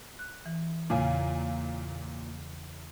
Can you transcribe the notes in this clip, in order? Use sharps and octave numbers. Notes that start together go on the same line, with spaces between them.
F#6
E3
E2 A#2 C#3 F5 G#5